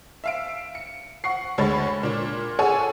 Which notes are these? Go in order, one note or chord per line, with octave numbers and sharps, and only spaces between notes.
E5 F5 D7
C#7
F#5 C#6 C7
D2 G#3 C#5 B5 A6
A#2 D4
G#4 A4 C#5 F#5 G#5